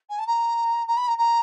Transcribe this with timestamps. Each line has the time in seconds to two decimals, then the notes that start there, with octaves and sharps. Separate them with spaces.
0.10 G#5
0.19 A5
0.27 A#5
0.88 A#5
0.97 B5
1.08 A#5
1.18 A#5